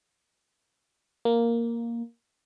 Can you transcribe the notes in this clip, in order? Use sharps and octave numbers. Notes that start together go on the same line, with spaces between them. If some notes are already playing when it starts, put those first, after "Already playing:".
A#3